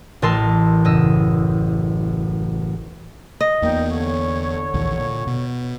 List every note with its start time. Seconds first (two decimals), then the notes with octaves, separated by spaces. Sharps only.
0.22 A1 A#4 D#5 A5 C6 E6
0.85 F#1 D#5 E6
3.41 D#5
3.62 E2 A#2 A#3 B3 D#4 G5
3.90 D3 C#5
4.74 A#1 D#2 E3
4.99 A#2
5.27 B2